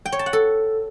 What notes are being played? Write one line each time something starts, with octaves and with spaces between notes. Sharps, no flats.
G5
C#5
A5
F#5
A4